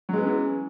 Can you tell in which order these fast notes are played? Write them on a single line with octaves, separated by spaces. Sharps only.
F#3 G#3 B3 C#4 E3